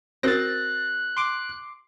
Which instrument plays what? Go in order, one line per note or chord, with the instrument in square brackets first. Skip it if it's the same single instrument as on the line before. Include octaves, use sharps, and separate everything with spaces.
[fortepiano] C4 [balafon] F#4 A#4 [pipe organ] F#6 [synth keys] A6 A#6
[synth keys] C6 D6